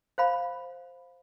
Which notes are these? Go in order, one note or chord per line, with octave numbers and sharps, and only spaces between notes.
C5 F5 B5